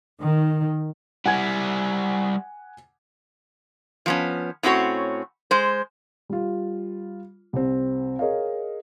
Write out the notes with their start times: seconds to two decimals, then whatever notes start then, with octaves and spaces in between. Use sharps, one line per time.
0.19 D#3
1.26 G3 E4 F#5 G#5 G#6
4.06 F3 B3 C#4
4.63 A2 C4 C#4 F#4 C#5
5.51 G#3 C5
6.29 G3 F4
7.53 C2 C4
8.19 G#4 A#4 C#5 D#5 F5